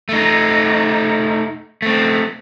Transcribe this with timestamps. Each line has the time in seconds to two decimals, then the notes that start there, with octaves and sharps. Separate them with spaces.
0.09 A3 D#4
1.82 A3 C4